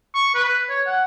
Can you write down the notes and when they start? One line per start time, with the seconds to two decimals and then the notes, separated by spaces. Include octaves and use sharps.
0.14 C#6
0.35 B4
0.70 C#5
0.87 F#5